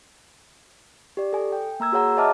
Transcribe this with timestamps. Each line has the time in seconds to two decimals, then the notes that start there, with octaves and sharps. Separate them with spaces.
1.17 G4 D5
1.33 A4 G#5
1.52 G5
1.80 A#3 A#5 E6 G#6
1.92 F#4 G#4 C#5 F#5 A#5
2.17 C#5 D#5 E5 A5 D6 F6